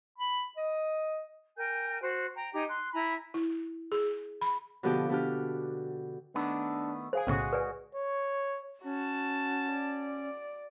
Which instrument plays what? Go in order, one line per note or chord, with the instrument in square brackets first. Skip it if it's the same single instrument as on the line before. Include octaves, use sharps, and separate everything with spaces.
[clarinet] B5
D#5
[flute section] A#4 G5 G#5 G6
F#4 C5 F#6
G5 A#5
D#4 G4 G#5 A#5
C6 F#6
E4 G#5 A#5 B5
[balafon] E4
G#4
B5
[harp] B2 D3 F3 B3 G4
B2 D4 G4 F6
[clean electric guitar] D#3 A3 B3 [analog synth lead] D4
[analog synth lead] G#4 [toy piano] C5 F5 G#5
[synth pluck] B1 A2 C#3 [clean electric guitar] G#3 F#4
[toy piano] B4 D5 G#5
[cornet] C#5
[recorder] C#4 [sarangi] F#4 [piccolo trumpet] A5
[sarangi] D5